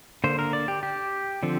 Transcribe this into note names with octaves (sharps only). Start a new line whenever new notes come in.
D3 A#3 C5
A#4
D5
G4
G4
D3 F3 C4